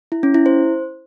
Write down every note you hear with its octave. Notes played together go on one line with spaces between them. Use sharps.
E4
C#4
E4
C5